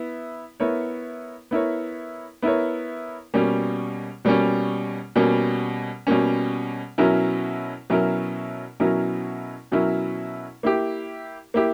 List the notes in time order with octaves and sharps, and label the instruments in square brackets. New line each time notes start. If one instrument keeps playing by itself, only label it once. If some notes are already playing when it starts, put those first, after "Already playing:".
Already playing: [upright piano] B3 E4
B3 E4 A#4 C#5
B3 E4 A#4 C#5
B3 E4 A#4 C#5
B2 G3 A#3 C#4
B2 G3 A#3 C#4
B2 G3 A#3 C#4
B2 G3 A#3 C#4
B2 F#3 C#4 E4 A#4
B2 F#3 C#4 E4 A#4
B2 F#3 C#4 E4 A#4
B2 F#3 C#4 E4 A#4
A#3 E4 G4
A#3 E4 G4